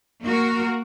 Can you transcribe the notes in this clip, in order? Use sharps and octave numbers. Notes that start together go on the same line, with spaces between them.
A#3 F#4 A#4